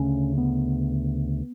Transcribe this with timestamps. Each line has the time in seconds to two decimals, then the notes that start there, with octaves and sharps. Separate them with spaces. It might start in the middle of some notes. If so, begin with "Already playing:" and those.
Already playing: D2 C#3 C#4
0.38 B3